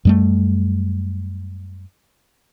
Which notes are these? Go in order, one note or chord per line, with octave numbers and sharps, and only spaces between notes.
F#2 G3 A3